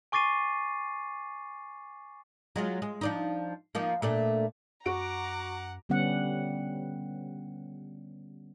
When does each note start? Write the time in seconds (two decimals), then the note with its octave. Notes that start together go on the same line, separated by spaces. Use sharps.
0.12 G#5 C#6 D6 A6 C7 D#7
2.56 F#3 G#3 F4
2.82 G#3
3.01 F3 D4 D#4
3.75 F3 A#3 D#4
4.02 A#2 A3 D4
4.86 F#2 F#4 F#5 A#5 D6 D7
5.89 D3 G3 B3 C#4 F#5